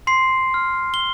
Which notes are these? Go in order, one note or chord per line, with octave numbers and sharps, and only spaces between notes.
C6 C7
F6
G7